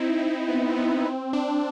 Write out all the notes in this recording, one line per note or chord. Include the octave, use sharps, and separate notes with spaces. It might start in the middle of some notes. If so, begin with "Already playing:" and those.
Already playing: C4 D#4 E4
C4
B3
C4
B3
C4
D4